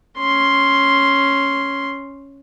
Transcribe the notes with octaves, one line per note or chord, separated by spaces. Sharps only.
C#4 C6